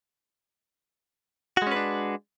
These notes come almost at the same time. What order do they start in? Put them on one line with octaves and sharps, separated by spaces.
F#4 G#3 C#4 B4 D4